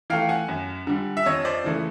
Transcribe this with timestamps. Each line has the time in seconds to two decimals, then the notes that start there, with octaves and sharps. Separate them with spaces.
0.10 E3 A3 F5 G5
0.29 F#5 G#5
0.48 F#2
0.87 D3 G3
1.17 E5
1.26 F2 C#5 D#5
1.45 C5 D5
1.64 C#3 E3 A3